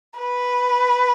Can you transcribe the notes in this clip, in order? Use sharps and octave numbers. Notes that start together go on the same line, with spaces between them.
B4